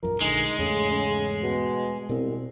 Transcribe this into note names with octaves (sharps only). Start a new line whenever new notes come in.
D#1 F#2 F3 A#4
A#1 D3 G#3 D#4
E2 G#2 C#3 A3
C#3
B2
C2 B2 C4